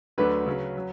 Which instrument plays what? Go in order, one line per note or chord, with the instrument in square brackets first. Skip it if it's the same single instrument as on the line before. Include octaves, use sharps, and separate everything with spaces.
[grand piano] D2 D3 F#3 A3 D4 [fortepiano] B4
[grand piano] C#3 F#3 C#4
F#3